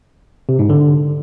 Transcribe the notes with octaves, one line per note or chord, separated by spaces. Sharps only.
C3
G#2
D3